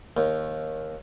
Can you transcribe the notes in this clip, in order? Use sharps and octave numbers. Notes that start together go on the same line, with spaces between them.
D#2